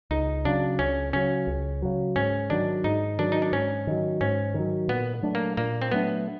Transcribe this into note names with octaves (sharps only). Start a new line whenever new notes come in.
C#2 D#4
C#3 F#3 D4
C#2 C#4
C#3 F#3 C#4
C#2
C#3 F#3
G#2 C#4
D#3 F#3 D4
G#2 D#4
D#3 F#3 D4
D#4
D4
G#2 C#4
D#3 F#3
G#2 C#4
D#3 F#3
A#2 B3
F#3 A3 D4
A#3
A#2 A#3
C4
F#3 A3 B3 D4